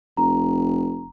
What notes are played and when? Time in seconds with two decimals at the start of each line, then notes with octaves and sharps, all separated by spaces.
0.17 F1 A#5